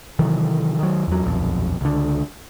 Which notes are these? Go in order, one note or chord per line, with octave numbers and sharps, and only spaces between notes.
C3 D#3 E3 F#3
D#3 F#3
E2 F#3
D#1 B1 F2
C#2 D3